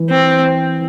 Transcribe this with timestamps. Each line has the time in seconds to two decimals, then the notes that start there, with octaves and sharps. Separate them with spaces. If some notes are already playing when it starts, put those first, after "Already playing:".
Already playing: E3
0.10 C4